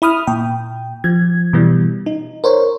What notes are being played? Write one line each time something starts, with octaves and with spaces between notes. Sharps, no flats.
E4 B5 D#6 F6
A#2 G5
F3 G#6
B2 E3 G3
D#4
A#4 C5 C#5